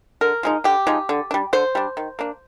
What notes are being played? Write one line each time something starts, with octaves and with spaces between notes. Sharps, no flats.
D3 A#4
F3 G#3 D#4
D3 G4
F3 G#3 D#4
D3
G3 D4
D3 C5
G3 D4
D#3
A#3 D4